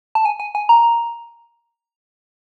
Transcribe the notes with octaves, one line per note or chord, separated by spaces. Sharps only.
A5
G#5
G#5
G#5
A#5